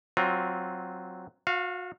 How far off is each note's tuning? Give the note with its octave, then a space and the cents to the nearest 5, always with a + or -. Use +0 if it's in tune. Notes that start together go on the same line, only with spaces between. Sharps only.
F#3 +5 C4 +0 F4 +20
F#4 -35 F5 +0